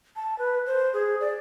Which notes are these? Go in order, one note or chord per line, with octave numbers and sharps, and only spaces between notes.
A5
B4
C5
G#4
D5